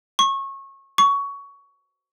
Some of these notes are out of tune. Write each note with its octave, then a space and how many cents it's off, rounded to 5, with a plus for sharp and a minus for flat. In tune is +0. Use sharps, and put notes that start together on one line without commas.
C#6 -25
C#6 +20